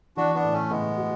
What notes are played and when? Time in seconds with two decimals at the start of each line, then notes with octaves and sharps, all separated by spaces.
0.17 E3 D4 F#4
0.35 B3 D4
0.44 A2
0.53 A3 C#4
0.70 A2 G#3 B3
0.98 F#4